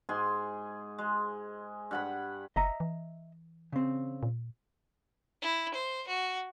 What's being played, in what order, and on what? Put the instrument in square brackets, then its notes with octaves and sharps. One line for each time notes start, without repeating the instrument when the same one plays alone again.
[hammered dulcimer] G#2 G#4 C6
G#3
G2 F#5 B5
[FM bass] F#1 [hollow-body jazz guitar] D#5 E5 A#5
[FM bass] E3
[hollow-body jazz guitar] C#3 C4
[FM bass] A#2
[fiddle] E4
C5
F#4